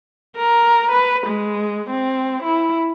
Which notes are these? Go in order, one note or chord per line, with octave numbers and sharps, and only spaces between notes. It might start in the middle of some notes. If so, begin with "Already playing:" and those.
A#4
B4
G#3
C4
E4